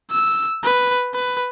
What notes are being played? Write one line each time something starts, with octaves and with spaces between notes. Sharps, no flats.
E6
B4
B4